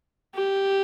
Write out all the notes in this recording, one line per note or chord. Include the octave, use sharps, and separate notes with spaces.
G4